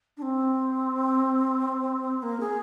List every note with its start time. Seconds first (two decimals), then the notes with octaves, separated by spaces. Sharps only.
0.17 D4
0.22 C4
2.22 A#3
2.40 G#4